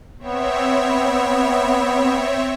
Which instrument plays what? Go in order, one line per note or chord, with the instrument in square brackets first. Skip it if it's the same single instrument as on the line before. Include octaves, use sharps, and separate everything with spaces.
[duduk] B3 [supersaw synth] C4 C#5 E5